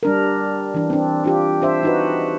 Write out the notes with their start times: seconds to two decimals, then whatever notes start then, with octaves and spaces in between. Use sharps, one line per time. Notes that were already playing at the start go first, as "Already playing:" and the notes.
0.03 G3 D4 A#4
0.74 E3 D4
0.90 C4 D4
1.24 D4 F4 G4
1.62 D4 C5 E5
1.83 D#4 F#4 B4